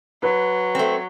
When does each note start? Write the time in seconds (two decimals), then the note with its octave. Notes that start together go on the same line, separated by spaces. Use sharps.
0.23 F#3 B4
0.75 A3 C4